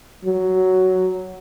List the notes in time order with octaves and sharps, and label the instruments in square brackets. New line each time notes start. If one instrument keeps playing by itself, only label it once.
[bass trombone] F#3